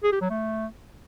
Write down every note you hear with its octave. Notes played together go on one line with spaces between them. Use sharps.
G#4
G4
F#3
A3